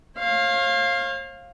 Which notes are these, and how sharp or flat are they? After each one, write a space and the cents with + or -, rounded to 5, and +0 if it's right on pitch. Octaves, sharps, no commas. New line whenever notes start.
C#5 -45 F5 +0